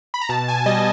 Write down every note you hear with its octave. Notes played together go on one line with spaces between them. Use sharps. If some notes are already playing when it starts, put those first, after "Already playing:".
B5
A#5
B2 A5
G#5
G3 D#5